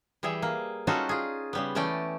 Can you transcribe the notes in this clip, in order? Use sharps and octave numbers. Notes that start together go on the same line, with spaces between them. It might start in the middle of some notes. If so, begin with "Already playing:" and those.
E3 G3 G#4 E5
A#3
G3 C#4 D#4 F4 F#4 A4
F4 G#4
C#3 G3 B3
E3 A3 C#4 D5 G5